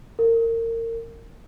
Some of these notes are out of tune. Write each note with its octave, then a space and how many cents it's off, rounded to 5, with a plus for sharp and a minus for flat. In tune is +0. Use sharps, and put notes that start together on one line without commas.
A#4 -30